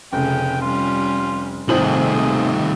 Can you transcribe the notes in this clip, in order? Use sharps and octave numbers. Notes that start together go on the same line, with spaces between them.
F1 C#3 C#4 G5
G3 C#4 F4
G#1 C3 D#3 G3 A3 G#4 C5 F#7